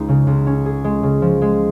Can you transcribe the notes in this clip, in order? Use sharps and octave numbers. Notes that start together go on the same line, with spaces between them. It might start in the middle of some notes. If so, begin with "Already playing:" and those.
Already playing: C#2 G#3 D#4
C#3
C#2
C#4
G#4
G#3
C#3
F3
G#3